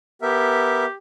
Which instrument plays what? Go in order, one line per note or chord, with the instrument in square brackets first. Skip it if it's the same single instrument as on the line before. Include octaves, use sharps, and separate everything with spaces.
[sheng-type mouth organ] B3 A#4 E5 [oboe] G4